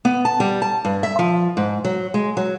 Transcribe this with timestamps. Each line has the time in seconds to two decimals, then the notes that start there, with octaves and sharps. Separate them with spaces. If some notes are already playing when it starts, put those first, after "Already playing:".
0.05 B3
0.25 A5
0.40 G3
0.62 A5
0.85 G2
1.03 E5
1.19 F3
1.57 G#2
1.84 F#3
2.14 G#3
2.37 F#3